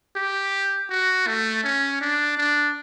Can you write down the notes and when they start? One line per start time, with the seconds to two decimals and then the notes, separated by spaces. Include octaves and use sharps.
0.16 G4
0.90 F#4
1.27 A3
1.64 C#4
2.01 D4
2.38 D4